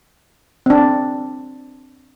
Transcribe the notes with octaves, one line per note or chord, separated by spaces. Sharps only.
C4 D4